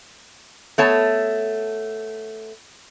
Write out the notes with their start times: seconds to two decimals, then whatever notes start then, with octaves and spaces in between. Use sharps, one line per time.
0.78 A3 B3 C#5 A5